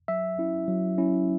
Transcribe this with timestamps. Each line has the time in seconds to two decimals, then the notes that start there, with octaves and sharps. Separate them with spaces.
0.08 F#3 E5
0.38 C#4 E4
0.68 F#3
0.98 C#4 E4